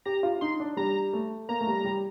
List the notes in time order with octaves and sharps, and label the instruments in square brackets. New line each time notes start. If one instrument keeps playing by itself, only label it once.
[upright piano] G4 [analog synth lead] A#5
[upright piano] F4
[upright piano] D#4 [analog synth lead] C6
[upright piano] D4
[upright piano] G3 [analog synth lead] A#5
[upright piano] A3
[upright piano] A#3 [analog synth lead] A#5
[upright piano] A3
G3
G3